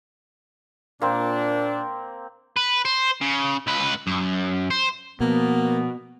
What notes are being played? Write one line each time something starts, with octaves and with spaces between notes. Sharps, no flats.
A#2 A#3 C4 D4
B4
C5
C#3
C#2 B4
F#2
C5
B2 F3 A#3 B3